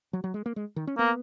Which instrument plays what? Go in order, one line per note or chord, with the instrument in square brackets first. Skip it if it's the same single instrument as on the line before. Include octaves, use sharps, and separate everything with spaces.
[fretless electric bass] F#3
F#3
G#3
A#3
G#3
D#3
C#4
[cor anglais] A#3 [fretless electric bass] B3